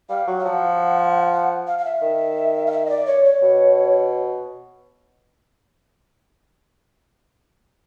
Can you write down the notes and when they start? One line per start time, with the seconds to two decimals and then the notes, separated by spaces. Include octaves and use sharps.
0.09 G3 F5
0.27 F#3
0.39 F5
0.45 F3 F#5
1.33 F#5
1.67 F5
1.78 F5
1.85 E5
2.02 D#3
2.66 F5
2.72 E5
2.86 D#5
2.89 D5
3.06 C#5
3.25 C#5
3.42 B2